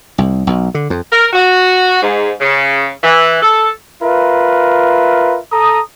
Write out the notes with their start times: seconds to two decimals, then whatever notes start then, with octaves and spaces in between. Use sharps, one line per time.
0.18 C2
0.47 B1
0.74 D3
0.90 F2
1.12 A#4
1.33 F#4
2.02 G#2
2.40 C#3
3.03 E3
3.42 A4
4.03 F4 A#4 B4 E5
5.51 A4 A#5 D#6